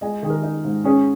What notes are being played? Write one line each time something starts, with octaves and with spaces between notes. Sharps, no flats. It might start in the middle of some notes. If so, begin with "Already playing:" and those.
G#3 D#5 G#5
D#3 G#4
A#4
D#4
G#2
C#4 G#4 C#5